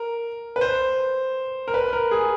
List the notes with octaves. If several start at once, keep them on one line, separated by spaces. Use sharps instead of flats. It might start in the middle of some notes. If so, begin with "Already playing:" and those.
Already playing: A#4
B4
C5
A#4
B4
A#4
G#4